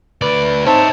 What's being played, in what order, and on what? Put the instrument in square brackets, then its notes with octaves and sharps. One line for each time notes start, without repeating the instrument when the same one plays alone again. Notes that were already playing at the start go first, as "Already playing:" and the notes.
[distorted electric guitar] D2 D5 [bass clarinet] B4
[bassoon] C4 [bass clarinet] D#4 [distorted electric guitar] C#5 E5 [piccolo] A5